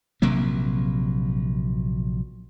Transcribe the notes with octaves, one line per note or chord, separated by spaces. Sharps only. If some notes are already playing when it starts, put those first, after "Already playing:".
A#1 C3 F#3 A#3